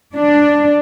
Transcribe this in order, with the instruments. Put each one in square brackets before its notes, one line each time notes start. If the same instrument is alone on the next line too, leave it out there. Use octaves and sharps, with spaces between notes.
[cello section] D4